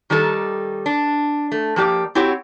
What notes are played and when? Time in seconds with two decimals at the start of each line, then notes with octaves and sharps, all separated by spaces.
0.10 D#3 G3 D#4 A4
0.86 D4
1.52 A3
1.76 F3 A#3 G4 D5
2.15 C4 E4 F#4 G4 C#5